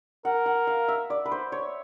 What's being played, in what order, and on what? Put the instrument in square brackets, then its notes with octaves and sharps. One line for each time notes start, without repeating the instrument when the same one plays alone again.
[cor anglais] A#4 [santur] F#5
[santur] F#5
F5
E5
D5
B4
C5
C#5